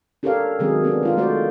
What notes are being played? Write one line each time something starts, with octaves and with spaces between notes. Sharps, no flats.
D4 G4 A4 A#4 C#5 F5
C3 D#3 F#3 G#3 C4 G#4
G#3 B3 C4 D4
G#3 F4 A#4
G#3 A3 F#4 C5 D5